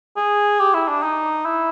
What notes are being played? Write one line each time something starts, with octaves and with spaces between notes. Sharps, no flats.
G#4
G4
E4
D4
D#4
E4